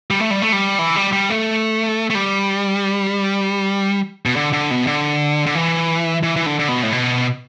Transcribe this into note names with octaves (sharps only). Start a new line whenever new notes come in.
G3
A3
G3
A3
G3
E3
G3
G3
A3
A3
G3
B2
D3
D3
B2
D3
D3
E3
E3
E3
D3
D3
B2
A2
B2